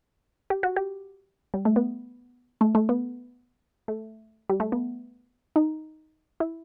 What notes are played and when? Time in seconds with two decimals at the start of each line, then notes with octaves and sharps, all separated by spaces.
0.50 G4
0.63 F#4
0.76 G4
1.54 G3
1.65 A3
1.76 B3
2.61 A3
2.75 A3
2.89 B3
3.88 A3
4.49 G3
4.60 A3
4.72 B3
5.56 D#4
6.40 E4